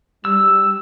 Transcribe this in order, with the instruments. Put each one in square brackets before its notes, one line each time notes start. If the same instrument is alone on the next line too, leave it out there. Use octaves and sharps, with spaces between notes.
[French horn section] G3 [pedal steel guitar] E6